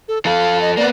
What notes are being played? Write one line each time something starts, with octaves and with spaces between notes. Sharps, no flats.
A4
F3 A4 F5
D#5
A#3 B3 D5